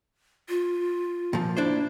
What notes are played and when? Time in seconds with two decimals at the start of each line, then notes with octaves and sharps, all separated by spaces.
0.49 F4
1.33 A#2 F3
1.57 D4 E4 C5